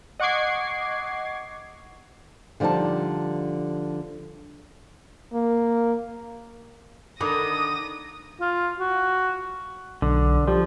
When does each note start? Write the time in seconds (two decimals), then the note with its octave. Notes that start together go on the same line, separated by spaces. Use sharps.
0.20 D#5 F#5 C#6 D6 G#6 C7
2.60 D3 F3 G3 D#4 A5
5.33 A#3
7.21 D3 D#3 B5 D6 D#6 A#6 D#7
8.41 F4
8.80 F#4
10.02 B1 D3
10.48 F3 G3